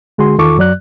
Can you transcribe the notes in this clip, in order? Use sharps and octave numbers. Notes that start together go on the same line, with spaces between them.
D3 G#3 F#4 G#4 C6
E2 D#3 F4 A4 C#6 D6
F#2 F#3 D5 F#6